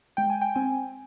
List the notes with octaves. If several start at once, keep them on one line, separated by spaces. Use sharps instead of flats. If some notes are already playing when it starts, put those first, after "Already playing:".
G#3 G5
G#5
G5
C4 G#5